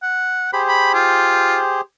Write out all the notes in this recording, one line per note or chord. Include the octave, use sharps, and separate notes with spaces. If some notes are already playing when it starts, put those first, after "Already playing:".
F#5
G4 G#4 C5 B5
B5
F4